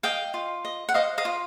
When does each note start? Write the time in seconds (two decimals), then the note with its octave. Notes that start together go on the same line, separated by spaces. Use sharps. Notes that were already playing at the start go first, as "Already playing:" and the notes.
0.03 D#5 F5 G5
0.34 F4
0.65 D#5
0.89 F#5
0.94 C5 D#5 F5
1.18 D#5 F5
1.25 F4